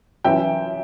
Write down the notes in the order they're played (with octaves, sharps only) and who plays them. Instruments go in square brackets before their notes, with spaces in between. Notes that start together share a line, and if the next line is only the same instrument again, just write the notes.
[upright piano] F#2 E3 E5 G5